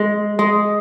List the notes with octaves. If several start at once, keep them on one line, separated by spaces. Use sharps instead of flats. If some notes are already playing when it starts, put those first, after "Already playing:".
Already playing: G#3
G#3